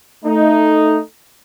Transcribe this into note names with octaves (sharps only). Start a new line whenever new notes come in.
A3 D#4